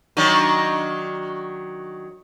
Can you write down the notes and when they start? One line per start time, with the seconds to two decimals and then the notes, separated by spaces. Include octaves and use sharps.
0.17 D#3 F#3 D4